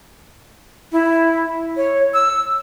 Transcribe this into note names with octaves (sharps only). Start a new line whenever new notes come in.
E4
C#5
E6